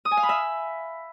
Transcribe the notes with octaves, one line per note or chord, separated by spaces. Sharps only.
D#6
G#5
F5
B5
E5